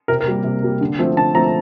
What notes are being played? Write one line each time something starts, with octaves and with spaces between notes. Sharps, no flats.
C3 A#4
A#4
G3 A#3
C3
G3 A#3
D3
F3 A3 C4
D3 A5
F3 A3 C4 A#5